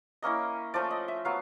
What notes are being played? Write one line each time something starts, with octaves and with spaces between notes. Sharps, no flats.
A#3 C#4 E4 D#5
F3 A3 C#4 D5
D#5
E5
F#3 B3 F5